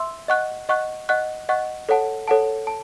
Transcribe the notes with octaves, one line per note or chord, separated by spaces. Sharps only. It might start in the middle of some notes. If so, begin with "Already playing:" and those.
Already playing: E5 C6 E6
D#5 F#5 C#6 F#6
D#5 F#5 C#6 F#6
D#5 F#5 C#6 F#6
D#5 F#5 C#6 F#6
A4 C#5 F#5 A5
A4 C#5 F#5 A5
A5